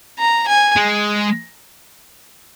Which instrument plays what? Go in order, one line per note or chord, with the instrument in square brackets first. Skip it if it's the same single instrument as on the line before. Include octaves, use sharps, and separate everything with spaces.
[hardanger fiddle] A#5
G#5
[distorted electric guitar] G#3